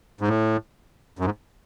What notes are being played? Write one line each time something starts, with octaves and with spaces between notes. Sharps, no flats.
G#2
A2
F#2
G#2